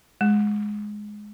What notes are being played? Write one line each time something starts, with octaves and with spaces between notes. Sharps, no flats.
G#3